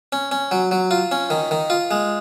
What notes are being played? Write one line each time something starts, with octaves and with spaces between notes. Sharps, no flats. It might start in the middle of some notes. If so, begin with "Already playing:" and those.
C#4
C#4
F#3
F#3
F4
C#4
D#3
D#3
F4
G#3